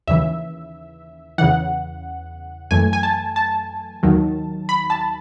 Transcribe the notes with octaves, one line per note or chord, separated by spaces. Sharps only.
D#2 C#3 E3 E5
E2 C#3 E3 F#5
F#2 E3 A3 G#5
G#5
A5
A5
D#2 D#3 F#3
B5
A5